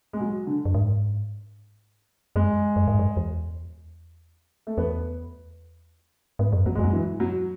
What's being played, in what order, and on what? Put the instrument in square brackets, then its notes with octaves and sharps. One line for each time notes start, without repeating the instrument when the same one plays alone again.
[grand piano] G#3
F#3
D3
[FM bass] F#2
G#2
[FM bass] F#2 [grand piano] G#3
[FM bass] F#2
G#2
F#2
E2
[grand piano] A3
[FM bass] E2 [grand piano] B3
[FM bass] G#2 [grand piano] B3
[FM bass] F#2
[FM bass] E2 [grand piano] F#3
[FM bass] F#2 [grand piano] G#3
[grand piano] F#3
E3
F#3